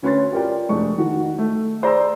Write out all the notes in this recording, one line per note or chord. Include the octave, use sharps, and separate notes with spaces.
D2 C#4 B4 C#5 C6 A6
F4 G4 A#4 D5 G5
F1 G#3 A3 D4 C#6
D#3 F#4
A3
G#4 C5 D5 A#5 C6 E6